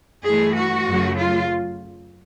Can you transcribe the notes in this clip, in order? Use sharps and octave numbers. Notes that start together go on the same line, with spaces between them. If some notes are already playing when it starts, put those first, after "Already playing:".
G2 E3 A3 G#4
F#4
F#2 C#3 F#3 A3
F4